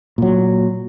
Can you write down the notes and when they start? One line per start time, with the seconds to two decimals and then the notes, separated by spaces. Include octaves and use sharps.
0.18 A#2 F#3